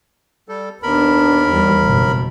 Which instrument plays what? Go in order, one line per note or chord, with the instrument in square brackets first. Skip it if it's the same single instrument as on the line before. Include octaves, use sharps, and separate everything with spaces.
[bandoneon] G3 A4
[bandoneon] D#2 A#4 B5 [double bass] B3 D4
[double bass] E2 G3
F#1 B2